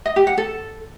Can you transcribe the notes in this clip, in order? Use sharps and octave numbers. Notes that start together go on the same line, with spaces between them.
D#5
G4
F#5
A4